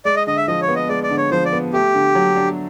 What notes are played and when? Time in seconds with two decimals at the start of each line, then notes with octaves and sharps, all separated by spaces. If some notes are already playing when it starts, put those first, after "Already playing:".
0.05 G#3 D5
0.17 D#5
0.27 D3 D#5
0.37 E5
0.48 F3 D#5
0.62 C#5
0.68 B3
0.76 D#5
0.89 G#3 D5
1.03 D5
1.10 D3
1.17 C#5
1.31 F3 C5
1.45 D5
1.52 B3
1.73 A3 G4
1.94 D3
2.15 F#3
2.36 D4